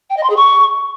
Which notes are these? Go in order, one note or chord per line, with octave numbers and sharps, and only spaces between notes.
G5
D#5
C6
G#4
C#6